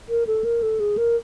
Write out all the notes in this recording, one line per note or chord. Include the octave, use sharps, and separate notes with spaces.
A#4
A4
A#4
A4
G#4
A#4